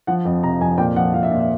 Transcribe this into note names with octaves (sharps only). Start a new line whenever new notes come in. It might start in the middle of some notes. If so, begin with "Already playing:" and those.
F3 F#5
F2
C3 A#5
F2 G#5
A#2 G5
F3 F#5
F3 F5
E5
A#2
E5